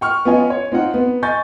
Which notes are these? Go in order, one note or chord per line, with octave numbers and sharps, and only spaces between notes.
G5 C#6 F6
B3 C#4 F4 D#5 G#5
C#5
C4 D#4 F4 F#5
B3
D#5 G#5 C#6 G6 A6